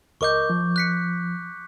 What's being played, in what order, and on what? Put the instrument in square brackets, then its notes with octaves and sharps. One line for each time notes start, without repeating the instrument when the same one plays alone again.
[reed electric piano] C#2 A#4 D#5 [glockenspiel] C#6 D6 G6
[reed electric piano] F3
[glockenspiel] F#6 B6 C#7